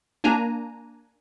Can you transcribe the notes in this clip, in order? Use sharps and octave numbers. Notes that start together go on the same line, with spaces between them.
A#3 D4 G#5 A#5